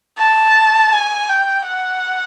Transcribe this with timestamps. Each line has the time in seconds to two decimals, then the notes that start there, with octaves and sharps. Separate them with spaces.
0.18 A5
0.93 G#5
1.29 G5
1.67 F#5